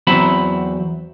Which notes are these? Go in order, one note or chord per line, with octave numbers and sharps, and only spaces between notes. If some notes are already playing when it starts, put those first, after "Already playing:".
E2 F#3 C4 E5 B5